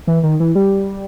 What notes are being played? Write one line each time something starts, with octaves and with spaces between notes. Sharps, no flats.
E3
D#3
E3
G3